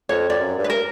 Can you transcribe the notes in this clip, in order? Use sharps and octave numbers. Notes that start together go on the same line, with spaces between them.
F2 C#5
F2 D5
F#2
G2
B4
A#4